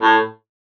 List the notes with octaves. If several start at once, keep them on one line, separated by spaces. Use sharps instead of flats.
A2